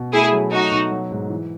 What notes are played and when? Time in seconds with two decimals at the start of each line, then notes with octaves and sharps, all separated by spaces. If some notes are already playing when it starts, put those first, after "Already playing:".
Already playing: B2
0.12 A3 E4 G#4
0.32 F#3
0.52 A3 D#4 F#4
0.71 B2
0.91 F#3
1.11 G#2
1.30 E3